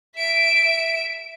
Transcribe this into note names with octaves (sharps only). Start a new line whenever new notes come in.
E5 D7